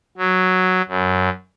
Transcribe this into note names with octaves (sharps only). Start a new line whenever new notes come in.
F#3
F#2